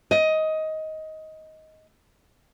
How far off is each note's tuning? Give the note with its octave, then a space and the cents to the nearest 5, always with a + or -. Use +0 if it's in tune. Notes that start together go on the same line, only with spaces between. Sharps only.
D#5 +15